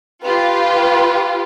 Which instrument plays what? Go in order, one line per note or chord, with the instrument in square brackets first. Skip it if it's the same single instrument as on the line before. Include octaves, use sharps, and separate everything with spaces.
[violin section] F4 G4 [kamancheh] B4